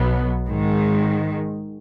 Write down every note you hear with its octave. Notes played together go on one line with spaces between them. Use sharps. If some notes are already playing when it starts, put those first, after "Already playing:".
Already playing: B1 B2 F#3 B3
G#2 D#3 G#3